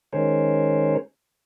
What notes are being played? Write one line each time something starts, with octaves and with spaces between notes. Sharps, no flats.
D#3 G#3 C#4 A#4 C5 C#5